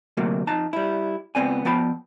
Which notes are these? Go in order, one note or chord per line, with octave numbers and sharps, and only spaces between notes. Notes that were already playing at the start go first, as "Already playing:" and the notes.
D2 C3 F#3 A3 A#3
F2 D#4 A5 A#5
G3 E4
C#2 G3 B3 C4 D5 G#5
F3 B3 G5 A5 B5